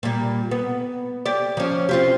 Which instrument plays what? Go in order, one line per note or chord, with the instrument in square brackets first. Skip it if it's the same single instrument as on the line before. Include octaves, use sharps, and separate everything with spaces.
[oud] A#2 G3
B3
G4 D5
F3 C#4
C4 F4 G4